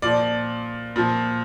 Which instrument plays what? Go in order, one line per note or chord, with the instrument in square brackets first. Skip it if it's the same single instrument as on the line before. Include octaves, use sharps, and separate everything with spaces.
[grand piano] A#2 F3 D5
A#2 F3